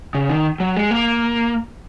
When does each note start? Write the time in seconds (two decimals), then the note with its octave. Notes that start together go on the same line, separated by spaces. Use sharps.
0.15 C#3
0.29 D#3
0.60 F#3
0.77 G#3
0.91 A#3